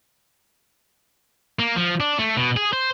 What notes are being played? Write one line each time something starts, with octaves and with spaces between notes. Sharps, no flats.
A#3
F3
D4
A3
B2
G#4
C5